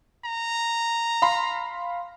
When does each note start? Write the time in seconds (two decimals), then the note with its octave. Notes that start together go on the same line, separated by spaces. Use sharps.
0.24 A#5
1.22 F5 B5 C6